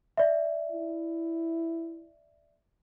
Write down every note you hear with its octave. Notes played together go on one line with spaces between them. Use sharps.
D5 E5
E4